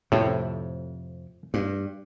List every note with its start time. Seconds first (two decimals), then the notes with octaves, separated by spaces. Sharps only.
0.12 F2 A2 C3
1.54 G2